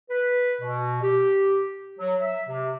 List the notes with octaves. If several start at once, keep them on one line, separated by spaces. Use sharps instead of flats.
B4
B2
G4
F#3
E5
C3